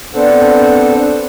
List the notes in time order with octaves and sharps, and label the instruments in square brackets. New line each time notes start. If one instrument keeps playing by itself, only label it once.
[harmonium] B3 C4 D4 A4 C5 F#5